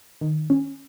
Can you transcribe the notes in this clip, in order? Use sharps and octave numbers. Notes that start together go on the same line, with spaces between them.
D#3
C#4